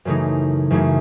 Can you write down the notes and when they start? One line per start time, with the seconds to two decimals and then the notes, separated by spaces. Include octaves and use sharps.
0.05 F#2 C#3 E3 A3 D#4
0.71 F#2 C#3 E3 A3 D#4